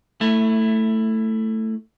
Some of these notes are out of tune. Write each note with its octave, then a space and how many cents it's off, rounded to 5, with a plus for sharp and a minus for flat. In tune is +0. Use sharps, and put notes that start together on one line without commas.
A3 +10 E4 +0